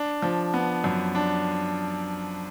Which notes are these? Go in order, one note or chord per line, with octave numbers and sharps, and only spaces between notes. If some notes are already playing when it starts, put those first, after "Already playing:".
Already playing: D4
F3
B3
F#2
D4